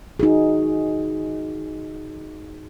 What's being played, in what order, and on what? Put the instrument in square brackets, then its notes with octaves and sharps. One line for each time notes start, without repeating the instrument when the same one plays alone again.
[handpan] D#4 F#4 G#4